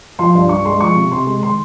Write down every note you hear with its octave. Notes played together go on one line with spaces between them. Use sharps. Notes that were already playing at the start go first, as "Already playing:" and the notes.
F3 C6
G2
G2 C#6
G#3 C6
F3 C#6
C3
C3 C6
G#3
D#3 C6